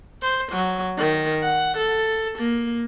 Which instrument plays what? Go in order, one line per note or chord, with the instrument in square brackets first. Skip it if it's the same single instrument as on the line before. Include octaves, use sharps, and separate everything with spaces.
[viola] C5
F#3
D#3
F#5
A4
A#3